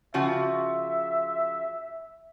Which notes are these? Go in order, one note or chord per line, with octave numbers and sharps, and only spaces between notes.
C#3 F3 F#4 E5